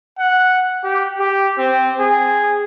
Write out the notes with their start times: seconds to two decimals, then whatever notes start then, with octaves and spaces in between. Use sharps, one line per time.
0.19 F#5
0.84 G4
1.19 G4
1.58 C4
1.99 G#4